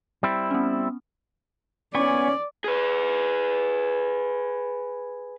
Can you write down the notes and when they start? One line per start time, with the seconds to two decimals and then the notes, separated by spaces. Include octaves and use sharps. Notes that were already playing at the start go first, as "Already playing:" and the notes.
0.23 G3 C4 E4
0.51 B3 C#4
1.95 B3 C#4 D5 G#5 C#6
2.64 G#4 B4